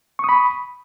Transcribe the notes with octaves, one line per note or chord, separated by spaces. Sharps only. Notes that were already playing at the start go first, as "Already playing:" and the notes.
B5 C#6 D#6